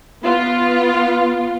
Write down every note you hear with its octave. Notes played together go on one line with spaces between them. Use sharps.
B3 F4